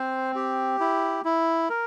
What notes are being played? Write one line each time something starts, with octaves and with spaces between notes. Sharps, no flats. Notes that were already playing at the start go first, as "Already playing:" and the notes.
Already playing: C4 C5
G4
E4
E4
A#4